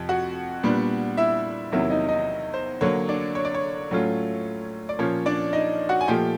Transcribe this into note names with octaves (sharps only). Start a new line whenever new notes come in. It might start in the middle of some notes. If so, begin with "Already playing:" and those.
Already playing: F2 C3 F3
F#4 F#5
A#2 G3 B3 D4
E4 E5
E2 C3 D#3 F#3 A#3 E4 E5
D#4 D#5
D#4 D#5
C5
D3 F#3 A#3 C#5
D4 D5
C#5
D5
C#5
A2 F#3 A3 C#4 F4
D5
A#2 F3 A#3 C#4 C#5
D4 D5
D#4 D#5
F#4 F#5
G#5
A#2 F3 A3 G4 G5